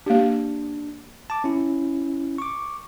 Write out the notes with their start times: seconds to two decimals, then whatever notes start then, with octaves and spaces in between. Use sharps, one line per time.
0.06 A#3 D4 G4
1.30 A5 D6
1.44 C#4 E4
2.38 C#6 D6